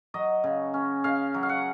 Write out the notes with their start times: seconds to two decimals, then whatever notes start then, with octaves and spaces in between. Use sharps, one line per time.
0.14 F#3 D#5
0.44 C#3
0.74 C#4
1.04 C#3 F5
1.34 F#3
1.43 F5
1.49 F#5